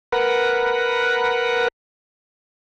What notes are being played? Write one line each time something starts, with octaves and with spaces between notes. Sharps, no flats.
A#4 B4 F#5